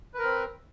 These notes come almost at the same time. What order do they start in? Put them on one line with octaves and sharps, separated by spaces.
B4 A#4 C4